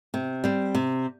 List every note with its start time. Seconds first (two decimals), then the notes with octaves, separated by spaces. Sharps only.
0.14 C3
0.44 G3 C4
0.75 C3